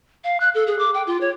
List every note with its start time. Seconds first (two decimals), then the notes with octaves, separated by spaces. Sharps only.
0.24 F5
0.40 F#6
0.55 A4
0.67 G#4
0.79 D6
0.94 G5
1.07 F4
1.21 C#5